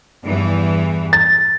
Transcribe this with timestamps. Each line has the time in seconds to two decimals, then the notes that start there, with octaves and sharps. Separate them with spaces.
0.24 E2 G2 E3
1.13 A6